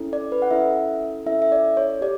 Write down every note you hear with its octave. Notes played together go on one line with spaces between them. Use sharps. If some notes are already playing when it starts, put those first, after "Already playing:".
Already playing: C#4 E4 A4
D5
B4
F#5
C#4 E4 A4 E5
C#4 E4 A4 E5
E5
D5
C#5
G4 D5